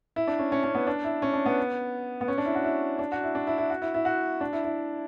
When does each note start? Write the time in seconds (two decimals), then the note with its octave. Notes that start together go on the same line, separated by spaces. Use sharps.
0.16 E4
0.27 D4
0.39 C#4
0.52 C#4
0.64 C#4
0.75 B3
0.87 D4
1.04 E4
1.22 C#4
1.33 D4
1.46 B3
2.21 B3
2.28 C#4
2.38 D4
2.46 E4
2.55 F#4
2.64 E4
2.99 D4
3.12 F#4
3.23 E4
3.35 D4
3.47 E4
3.58 E4
3.70 F#4
3.82 E4
3.94 E4
4.05 F#4
4.41 D4
4.53 E4
4.64 E4